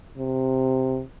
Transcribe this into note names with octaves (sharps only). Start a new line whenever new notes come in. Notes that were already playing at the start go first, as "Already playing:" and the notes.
C3